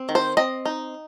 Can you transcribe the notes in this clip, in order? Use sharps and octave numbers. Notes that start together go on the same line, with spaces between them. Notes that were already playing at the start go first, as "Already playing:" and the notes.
Already playing: C4
D#3
C5
C4 D#5
D#4